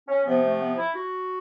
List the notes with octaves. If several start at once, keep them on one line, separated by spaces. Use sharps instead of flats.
C#4
C3 F3 B3
A3
B3
E4
F#4